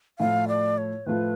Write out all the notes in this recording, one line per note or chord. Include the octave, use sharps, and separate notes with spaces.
A2 F3 A3 F4 F5
D5
C#5
A2 F3 A3 F4 B4